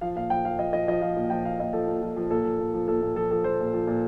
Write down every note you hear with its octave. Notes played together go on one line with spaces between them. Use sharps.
F3 F5
A#2 F5
F3 G5
F3 F5
F3 D#5
F3 D#5
F3 D#5
F3 F5
A#2
F3 G5
F3 F5
A#2 D#5
F3 A4
A#2
F3
F3
A#2 A4
F3
A#2
F3
A#2 A4
A#2
F3 A4
F3 A4
F3 C5
A#2
F3
A#2